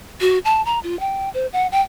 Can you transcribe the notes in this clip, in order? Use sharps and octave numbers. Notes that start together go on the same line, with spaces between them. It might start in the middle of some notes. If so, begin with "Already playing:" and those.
F#4
A5
A#5
F4
G5
C5
F#5
G5